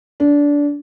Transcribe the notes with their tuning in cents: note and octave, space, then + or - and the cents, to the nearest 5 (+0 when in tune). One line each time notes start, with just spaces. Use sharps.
D4 -20